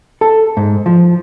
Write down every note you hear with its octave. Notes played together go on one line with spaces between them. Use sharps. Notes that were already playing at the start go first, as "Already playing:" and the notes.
A4
G#2
F3